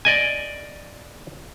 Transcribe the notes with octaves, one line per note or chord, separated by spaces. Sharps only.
D5 D#5 G#5